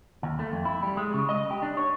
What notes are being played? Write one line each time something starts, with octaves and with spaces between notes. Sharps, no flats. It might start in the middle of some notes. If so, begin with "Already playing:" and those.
D#2
A3
F2
E4
G3
G#3
C#3
D#5
G4
D4
C#5